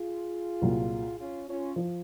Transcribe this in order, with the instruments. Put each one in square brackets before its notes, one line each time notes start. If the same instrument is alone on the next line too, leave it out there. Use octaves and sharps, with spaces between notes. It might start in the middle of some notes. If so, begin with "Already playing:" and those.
Already playing: [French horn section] F4 G#4
[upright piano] C2 A#2 F#3
[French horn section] C#4 F4
C#4 F4
[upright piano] F3